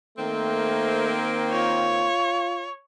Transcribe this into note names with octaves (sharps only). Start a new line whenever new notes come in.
D#3 A3 A#3 C4
F4 C#5